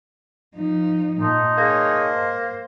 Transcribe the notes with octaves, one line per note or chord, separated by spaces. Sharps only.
F3 D#4
A#2 D#4 D#5 A5 C6
A#3 G#4 C#5
C5